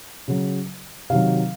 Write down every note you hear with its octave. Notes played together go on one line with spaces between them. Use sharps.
C#3 F#3
C3 D#3 F#3 F5